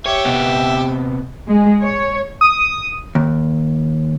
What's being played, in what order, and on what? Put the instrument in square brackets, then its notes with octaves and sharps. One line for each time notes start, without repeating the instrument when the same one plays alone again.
[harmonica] G4 E5 [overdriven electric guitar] C#5
[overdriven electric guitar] C3 B3
[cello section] G#3
C#5
[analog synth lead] D#6
[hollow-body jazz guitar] D#2